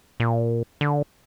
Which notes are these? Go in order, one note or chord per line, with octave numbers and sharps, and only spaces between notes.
A#2
D3